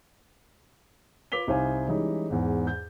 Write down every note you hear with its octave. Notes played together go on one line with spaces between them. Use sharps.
F4 B4 D6 B6 F7 G7
C2 D#4 C5 F5 G#5
E3 G3 G#3 C#4 D#4
E2 G#2
G6